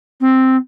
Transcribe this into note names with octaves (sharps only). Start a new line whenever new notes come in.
C4